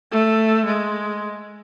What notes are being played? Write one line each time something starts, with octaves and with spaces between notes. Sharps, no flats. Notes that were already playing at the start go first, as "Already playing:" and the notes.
A3
G#3